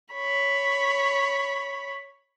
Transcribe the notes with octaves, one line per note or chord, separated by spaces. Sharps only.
C#5 B5